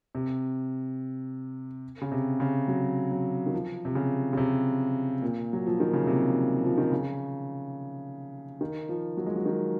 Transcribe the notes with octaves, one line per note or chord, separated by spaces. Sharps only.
C3
C#3
C3
C#3
F#3
F#3
D#3
F3
C3
C#3
C#3
C3
A#2
F#3
F3
D#3
C#3
C3
F3
D#3
C#3
D#3
F3
F#3
G#3
F#3
D#3